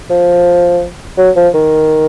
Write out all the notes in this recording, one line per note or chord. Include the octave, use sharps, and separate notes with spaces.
F3
F#3
F3
D#3